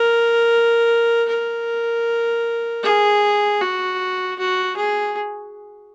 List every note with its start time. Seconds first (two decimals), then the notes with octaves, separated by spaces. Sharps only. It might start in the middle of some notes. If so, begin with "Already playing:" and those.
Already playing: A#4
1.29 A#4
2.83 G#4
3.62 F#4
4.39 F#4
4.77 G#4